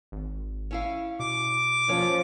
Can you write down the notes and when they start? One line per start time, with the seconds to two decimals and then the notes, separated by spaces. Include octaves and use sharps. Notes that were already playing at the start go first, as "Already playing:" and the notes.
0.12 G#1
0.71 C#4 E4 F5
1.20 B2 D6
1.88 D#2 F3 C#4 C#5